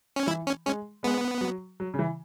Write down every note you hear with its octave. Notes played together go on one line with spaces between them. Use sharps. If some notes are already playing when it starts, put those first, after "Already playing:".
C#4
E3 E4
C#4
G#3 C#4
G#3 B3
F#3
F#3
C#3
E3